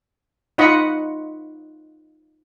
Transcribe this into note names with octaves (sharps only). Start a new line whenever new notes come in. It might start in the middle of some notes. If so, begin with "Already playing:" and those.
D#4 F4 D#5 F#5 B5 C#6